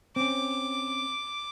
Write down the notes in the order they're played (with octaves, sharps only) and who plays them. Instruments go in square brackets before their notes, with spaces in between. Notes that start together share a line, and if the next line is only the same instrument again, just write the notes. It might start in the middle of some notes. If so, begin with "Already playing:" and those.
[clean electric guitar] C4 C#4 [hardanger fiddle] D6